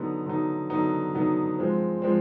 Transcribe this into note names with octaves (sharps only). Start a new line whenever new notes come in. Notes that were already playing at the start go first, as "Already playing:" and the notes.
Already playing: D3 F#3 B3 D#4
D3 F#3 B3 D#4
D3 F#3 B3 D#4
D3 F#3 B3 D#4
F3 G#3 C4
F3 G#3 C4